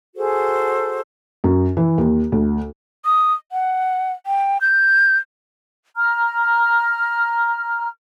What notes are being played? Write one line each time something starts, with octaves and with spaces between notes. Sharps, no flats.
F#4 G#4 A4 C5
F#2
E3
D#2
D2
D#6
F#5
G5
G6
A#5 F6